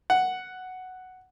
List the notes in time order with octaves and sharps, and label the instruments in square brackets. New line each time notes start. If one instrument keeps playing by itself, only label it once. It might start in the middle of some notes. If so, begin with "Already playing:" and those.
[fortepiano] F#5